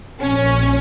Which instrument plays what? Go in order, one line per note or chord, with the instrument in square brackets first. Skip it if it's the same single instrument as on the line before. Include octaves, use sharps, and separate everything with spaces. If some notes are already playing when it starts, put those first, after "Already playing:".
[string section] A#1 C#4